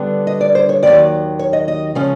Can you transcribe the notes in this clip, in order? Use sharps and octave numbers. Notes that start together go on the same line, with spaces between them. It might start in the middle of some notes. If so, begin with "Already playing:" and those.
Already playing: D3 G3 B3 D4
D#5
D5
C5
C#5
D#2 D#3 F#3 D5
C#5
D#5
D#5
C#3 F3 G#3 C#4